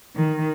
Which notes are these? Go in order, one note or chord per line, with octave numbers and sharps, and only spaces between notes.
D#3